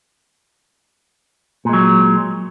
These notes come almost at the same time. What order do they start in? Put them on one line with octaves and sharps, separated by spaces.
A#2 G#3 F#3